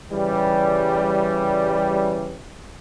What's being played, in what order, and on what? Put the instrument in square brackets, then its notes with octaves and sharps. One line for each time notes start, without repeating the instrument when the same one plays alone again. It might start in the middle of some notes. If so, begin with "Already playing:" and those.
[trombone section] C#3 E3 G3